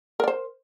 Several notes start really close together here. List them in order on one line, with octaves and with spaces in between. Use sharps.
A#4 D5 C5